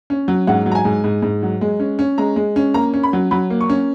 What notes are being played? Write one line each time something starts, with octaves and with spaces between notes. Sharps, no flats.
C#4
F#3
G#2 F#5
F#3
A#5
G#5
G#2
G#2
G#2
F#3
G#3
C#4
C#4
G#3 A#5
G#3
C#4
A#3 A#5
C#4
B5
F#3
F#3 B5
A#3
C#6
C#4